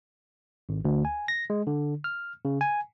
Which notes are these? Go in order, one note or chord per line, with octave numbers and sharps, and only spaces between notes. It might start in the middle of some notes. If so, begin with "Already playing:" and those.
G#1
D2
G#5
A#6
G#3
D3
F6
C#3
G#5